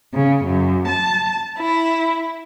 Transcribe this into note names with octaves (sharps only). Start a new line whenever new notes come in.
C#3
F#2
A5
E4